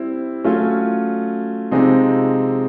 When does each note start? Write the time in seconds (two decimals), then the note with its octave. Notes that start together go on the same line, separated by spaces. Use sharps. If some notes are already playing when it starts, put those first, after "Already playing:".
Already playing: G3 C4 E4
0.44 F#3 A3 C#4 F4
1.71 C3 F3 G#3 C4 D#4